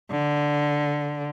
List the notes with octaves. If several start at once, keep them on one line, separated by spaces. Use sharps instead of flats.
D3